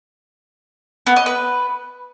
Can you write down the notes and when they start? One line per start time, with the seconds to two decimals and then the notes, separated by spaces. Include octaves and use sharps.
1.07 B3
1.16 D#5
1.26 B4